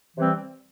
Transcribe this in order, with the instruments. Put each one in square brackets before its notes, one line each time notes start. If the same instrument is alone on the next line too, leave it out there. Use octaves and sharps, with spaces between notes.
[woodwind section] C3 E3 G3 C4